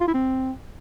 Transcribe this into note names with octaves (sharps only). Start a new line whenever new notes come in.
F4
E4
C4